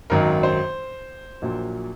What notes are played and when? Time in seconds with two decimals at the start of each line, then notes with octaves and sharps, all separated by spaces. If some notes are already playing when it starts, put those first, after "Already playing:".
0.10 G#1 F#2 D#3 F#3 A#4
0.43 C5
1.42 A#1 A#2 F#3